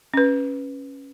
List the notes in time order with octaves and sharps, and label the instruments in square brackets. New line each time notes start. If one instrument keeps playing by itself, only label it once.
[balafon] C#4 B4